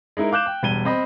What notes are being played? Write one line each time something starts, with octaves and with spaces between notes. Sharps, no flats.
G#3 D#4 E4 A#4
F5 D6 F#6 G6 E7
G5
E1 G3 G#6 D#7 G7
C4 D#5 B5